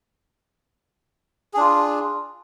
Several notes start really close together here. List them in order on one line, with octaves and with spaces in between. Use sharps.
G#4 D4 F4